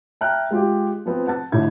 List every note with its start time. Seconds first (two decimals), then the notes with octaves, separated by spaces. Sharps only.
0.21 E5 G5 A5 A#5 F6 F#6
0.51 G#3 F4 G4
1.06 F3 B3 C4
1.27 F#5 A5 A6
1.52 A1 D3 A3 D#4 E4 G#6